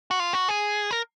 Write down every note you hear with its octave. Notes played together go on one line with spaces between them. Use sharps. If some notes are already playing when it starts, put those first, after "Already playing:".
F#4
F4
F#4
G#4
A#4